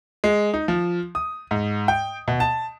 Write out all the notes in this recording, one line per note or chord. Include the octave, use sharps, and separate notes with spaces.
G#3
D#4
F3
D#6
G#2
G5
B2
A5